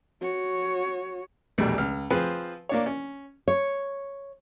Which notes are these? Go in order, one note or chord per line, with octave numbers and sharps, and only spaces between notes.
F#4 C#5
A#1 E2 B2 G3 A3
C#2 F6
F3 C4 G#4 B4
A#3 D4 C#5
C#4
C#5